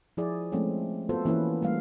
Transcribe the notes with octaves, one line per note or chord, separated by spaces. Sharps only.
F3 E4 G#4 D5
F3 G#3 A3 C4 C#4
B3 F4 F#4 A4 C5
E3 A#3 C#4 E4 B4
G3 A3 A#3 F5